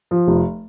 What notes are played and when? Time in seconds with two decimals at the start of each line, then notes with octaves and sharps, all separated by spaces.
0.11 F3
0.28 F1